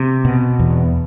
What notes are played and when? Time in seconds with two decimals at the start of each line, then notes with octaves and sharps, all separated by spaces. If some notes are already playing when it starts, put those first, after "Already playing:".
Already playing: C3
0.25 B2
0.60 E2